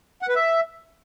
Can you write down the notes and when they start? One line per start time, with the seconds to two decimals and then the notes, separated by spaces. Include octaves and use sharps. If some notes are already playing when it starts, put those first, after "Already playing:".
0.22 F#5
0.29 B4
0.35 E5